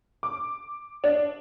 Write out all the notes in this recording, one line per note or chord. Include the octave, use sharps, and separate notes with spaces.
D6
D4